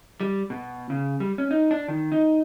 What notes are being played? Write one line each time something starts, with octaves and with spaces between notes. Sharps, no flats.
G3
B2
C#3
G3
C#4
D#4
D4
D#3
D#4